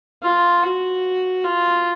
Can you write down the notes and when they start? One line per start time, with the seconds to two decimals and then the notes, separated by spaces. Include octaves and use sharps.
0.23 F4
0.64 F#4
1.44 F4